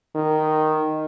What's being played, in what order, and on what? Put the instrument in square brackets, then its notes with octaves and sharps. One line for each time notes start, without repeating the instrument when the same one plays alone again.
[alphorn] D#3